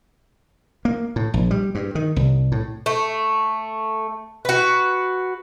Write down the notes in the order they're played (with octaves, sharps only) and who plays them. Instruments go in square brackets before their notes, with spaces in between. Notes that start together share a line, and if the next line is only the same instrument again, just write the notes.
[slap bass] A#3
A2
A#1
G3
G2
D#3
C2
A2
[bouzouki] A3
F#4 B4